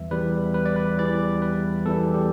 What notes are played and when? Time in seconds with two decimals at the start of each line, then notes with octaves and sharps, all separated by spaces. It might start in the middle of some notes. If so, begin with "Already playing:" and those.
Already playing: E2 E3 G3 E5
0.11 E2 E3 G3 B4
0.54 B4
0.66 D5
0.76 B4
0.98 E2 E3 G3 D5
1.42 B4
1.86 E2 E3 G3 A4
2.14 G4